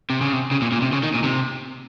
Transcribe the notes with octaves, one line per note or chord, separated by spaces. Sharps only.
C3
C#3
C3
C#3
A#2
A#2
C3
C#3
D#3
A#2
C3